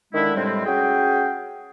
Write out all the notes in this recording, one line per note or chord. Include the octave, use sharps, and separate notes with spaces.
D3 D#3 G#3 D4 E4
A2 C3 G3 G#3 C4
C#4 F#4 G#4 G5